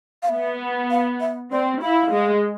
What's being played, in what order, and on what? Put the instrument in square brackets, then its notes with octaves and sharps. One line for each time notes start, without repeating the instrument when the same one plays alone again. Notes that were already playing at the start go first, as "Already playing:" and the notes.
[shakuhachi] F5
[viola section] B3 [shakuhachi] E5
[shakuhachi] F5
E5
[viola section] C4 [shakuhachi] D5
[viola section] E4 [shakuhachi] F5
[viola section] G#3